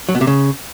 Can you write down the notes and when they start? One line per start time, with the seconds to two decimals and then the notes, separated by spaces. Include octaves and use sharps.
0.09 F#3
0.15 B2
0.21 C3
0.27 C#3